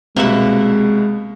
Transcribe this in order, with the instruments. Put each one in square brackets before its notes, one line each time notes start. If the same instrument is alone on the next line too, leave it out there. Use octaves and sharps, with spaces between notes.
[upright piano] C2 B2 G3 [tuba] G#3 [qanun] A#3 E5 F#5 [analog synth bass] C4